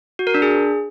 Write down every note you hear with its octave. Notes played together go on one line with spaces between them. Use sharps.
F#4
A#4
D4
G#4